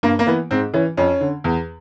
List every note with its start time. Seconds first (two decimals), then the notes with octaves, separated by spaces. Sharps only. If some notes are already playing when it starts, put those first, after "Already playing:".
0.03 G2 A#3
0.19 A#3
0.27 E3 B3
0.51 G#2 C4
0.74 E3 C#4
0.97 F2 C#4
1.21 D3
1.44 E2